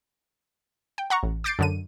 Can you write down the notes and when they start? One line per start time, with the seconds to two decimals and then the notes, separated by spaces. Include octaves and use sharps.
0.98 G5
1.10 F#5 A#5 C#6
1.23 A1
1.44 D6 G6 A6 C7 D7
1.59 F#2 D3 D#7